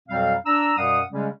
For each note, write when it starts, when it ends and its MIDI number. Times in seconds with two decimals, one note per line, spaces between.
0.08 0.35 41
0.08 0.35 47
0.08 0.35 54
0.08 0.35 55
0.08 0.35 60
0.08 0.35 77
0.46 0.73 62
0.46 0.73 82
0.46 0.73 88
0.77 1.01 42
0.77 1.01 47
0.77 1.01 55
0.77 1.01 77
0.77 1.01 78
0.77 1.01 87
1.11 1.28 49
1.11 1.28 55
1.11 1.28 56
1.11 1.28 61